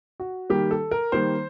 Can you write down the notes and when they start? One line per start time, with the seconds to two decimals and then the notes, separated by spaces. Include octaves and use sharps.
0.20 F#4
0.50 D#3 G3 A#3 G4
0.71 A4
0.91 A#4
1.12 D#3 G3 A#3 C5